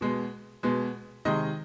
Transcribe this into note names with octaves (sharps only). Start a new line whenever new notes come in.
B2 G#3 B3
B2 G#3 B3
C3 D#3 G#3 D#5